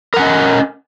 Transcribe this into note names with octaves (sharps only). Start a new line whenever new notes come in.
C#4 A#4 D#5 F#5